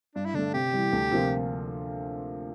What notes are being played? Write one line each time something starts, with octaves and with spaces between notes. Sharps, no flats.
G2 D4
E4
D3 A3 D4
C3 G4
E3 G3
D2
C3 F3 A#3 F4